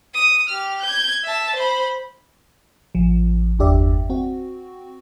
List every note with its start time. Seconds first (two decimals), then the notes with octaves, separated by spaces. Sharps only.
0.15 D#6
0.49 G4 F6
0.82 G6 G#6
1.24 E5 A5
1.56 C5 B5
2.95 A1 F3
3.59 G1 E2 D4 G4 D5 E5
4.10 C4 F#4